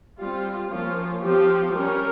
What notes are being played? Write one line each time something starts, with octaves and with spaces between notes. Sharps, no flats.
G3 C4 F4
F3 A#3 C#4 F4
F3 C4 G4
G3 C#4 A#4